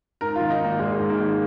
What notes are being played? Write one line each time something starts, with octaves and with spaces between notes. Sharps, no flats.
G#2 A#4
F4
D#3
D#4
G#1 A#3
G#1 G#3
G#2
A#3
D#3